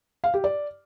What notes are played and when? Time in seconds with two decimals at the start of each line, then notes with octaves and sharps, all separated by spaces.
0.24 F5
0.34 G4
0.44 D5